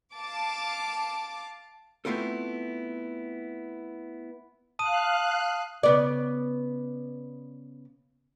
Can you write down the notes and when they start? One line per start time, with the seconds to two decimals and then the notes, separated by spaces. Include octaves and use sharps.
0.16 F5 A5 D6
2.05 A3 B3 C4 E4 F4 A4
4.79 F5 A5 D#6 F#6 D#7
5.83 C#3 B3 D5